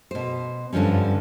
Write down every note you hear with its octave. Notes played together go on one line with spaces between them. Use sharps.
B2 C5
G2 D3 F3 G3 C#4